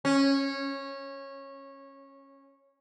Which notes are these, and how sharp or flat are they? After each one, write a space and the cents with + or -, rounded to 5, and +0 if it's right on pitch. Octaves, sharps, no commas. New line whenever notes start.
C#4 -15